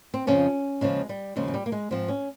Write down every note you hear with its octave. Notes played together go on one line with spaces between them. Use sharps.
C4
F2 C#3 F3 C#4
D#2 C#3 F3 G#3
G3
D#2 C#3 F3 G#3
G#3
G3
A#3
G#3
G#2 F3 C4
C#4